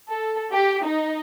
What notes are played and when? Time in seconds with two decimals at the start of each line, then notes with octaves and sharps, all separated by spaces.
0.10 A4
0.52 G4
0.83 D#4